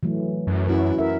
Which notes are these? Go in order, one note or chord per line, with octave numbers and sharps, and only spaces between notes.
E3 F#3 A3
F#2
C#4 E4 F#4 B4
A#4 E5